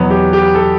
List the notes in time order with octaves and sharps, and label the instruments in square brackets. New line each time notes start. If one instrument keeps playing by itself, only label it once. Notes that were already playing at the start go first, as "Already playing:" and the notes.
Already playing: [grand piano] E2 B2 F#3 B3
G4
G4
A4